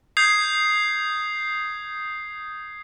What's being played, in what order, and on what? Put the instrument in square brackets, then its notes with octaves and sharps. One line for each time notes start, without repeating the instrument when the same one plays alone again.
[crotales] D#6 G6 G#6 C7